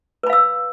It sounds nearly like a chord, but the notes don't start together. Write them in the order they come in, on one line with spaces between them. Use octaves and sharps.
B4 B5 F5 E6